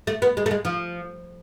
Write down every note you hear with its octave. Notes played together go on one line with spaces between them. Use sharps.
A3
B3
G#3
A3
G#3
F3